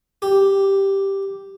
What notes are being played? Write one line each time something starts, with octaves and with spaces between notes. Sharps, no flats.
G4